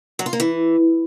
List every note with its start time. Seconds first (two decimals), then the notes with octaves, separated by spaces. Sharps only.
0.19 F#3
0.26 F4
0.33 A#3
0.40 E3